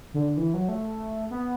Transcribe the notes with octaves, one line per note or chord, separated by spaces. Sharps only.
D3
E3
F#3
A3
B3